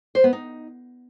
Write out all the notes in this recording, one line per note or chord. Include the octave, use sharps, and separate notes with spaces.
C5
B3
D#4